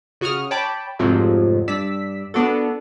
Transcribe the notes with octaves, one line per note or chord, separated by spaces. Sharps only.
C#3 F#4 C#6 D#6 F6
C#5 G5 A5 B5 D6
F2 G#2 C3 F3 F#3 A3
G2 D5 E6 B6
B3 D4 F#4 A4